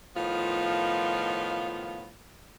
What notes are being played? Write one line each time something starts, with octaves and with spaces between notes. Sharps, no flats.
A2 D#3 F3 B3 F4